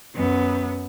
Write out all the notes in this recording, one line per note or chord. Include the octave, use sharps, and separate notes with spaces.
F#2 B3